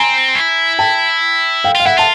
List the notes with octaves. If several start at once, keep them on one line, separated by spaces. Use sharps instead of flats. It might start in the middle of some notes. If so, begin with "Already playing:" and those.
Already playing: C4 G#5 A#5
E4
G5 A5
F5 G5
F4 F5
E4 E5 F#5
F4 A5